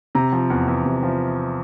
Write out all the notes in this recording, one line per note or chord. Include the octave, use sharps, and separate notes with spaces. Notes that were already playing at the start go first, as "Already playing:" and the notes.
C3 A#5
F3
E2
E2
C3
F3